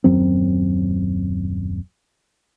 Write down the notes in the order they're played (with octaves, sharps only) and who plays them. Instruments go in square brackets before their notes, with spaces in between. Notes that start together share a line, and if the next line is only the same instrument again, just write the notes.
[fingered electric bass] D#1 F#2 F#3 C4